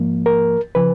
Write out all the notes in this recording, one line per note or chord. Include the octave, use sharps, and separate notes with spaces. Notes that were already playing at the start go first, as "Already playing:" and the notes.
Already playing: G#2 F3 A#3
A#4
C#3 F3 B4